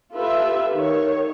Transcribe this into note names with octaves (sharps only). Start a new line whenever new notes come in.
F4 G4 A4 B4 E5
D#3 C#5